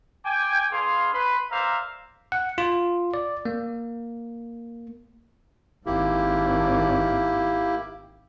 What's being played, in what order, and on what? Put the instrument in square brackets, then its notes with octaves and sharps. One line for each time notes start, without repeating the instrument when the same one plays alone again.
[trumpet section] G5 G#5 D6
D4 G#4 B4 F5 C6
B4 B5 C6
A#4 C5 D5 E5 F5 A#5
[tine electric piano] F#5
F4
D5
A#3
[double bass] G#1 G#2 [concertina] A#3 E4 G4